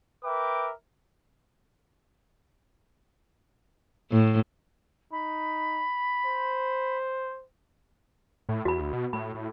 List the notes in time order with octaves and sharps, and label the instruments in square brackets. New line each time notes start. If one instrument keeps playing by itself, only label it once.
[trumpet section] A#4 B4 E5 G5 D6
[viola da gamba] A2
[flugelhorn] D#4 [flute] B5
[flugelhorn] C5
[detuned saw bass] A2
[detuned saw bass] E2 [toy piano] F#4 B5
[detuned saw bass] D2
B2
[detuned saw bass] A2 [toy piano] B5
[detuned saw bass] A2